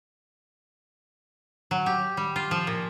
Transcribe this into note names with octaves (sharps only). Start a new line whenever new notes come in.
F#3
G4
G3
F4
F3
A#2